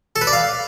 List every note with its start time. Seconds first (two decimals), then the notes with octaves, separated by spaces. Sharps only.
0.16 A4
0.21 B4
0.27 D5
0.33 F5